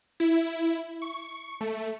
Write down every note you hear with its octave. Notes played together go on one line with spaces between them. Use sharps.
E4
C#6
A3